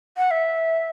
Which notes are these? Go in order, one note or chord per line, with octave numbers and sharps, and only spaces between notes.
F#5
E5